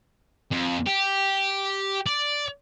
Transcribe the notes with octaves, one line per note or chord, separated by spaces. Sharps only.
F2
G4
D5